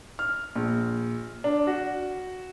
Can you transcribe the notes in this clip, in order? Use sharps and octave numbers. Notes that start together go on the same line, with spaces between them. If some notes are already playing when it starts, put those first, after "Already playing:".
F6
A#1
D4
F#4